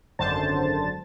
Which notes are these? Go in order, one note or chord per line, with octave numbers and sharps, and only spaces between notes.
G#1 F#2 D3 C5 A5 A6